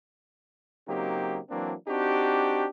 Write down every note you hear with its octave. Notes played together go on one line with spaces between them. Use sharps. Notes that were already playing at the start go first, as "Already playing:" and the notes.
C#3 F#3 A#3 C4 D#4 G4
E3 F#3 A#3 C4 D4
C4 D4 D#4 F#4 G4